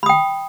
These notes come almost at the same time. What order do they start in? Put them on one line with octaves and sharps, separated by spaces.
B5 D#6 G5